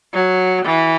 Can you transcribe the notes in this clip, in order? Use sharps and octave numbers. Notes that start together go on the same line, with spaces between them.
F#3
E3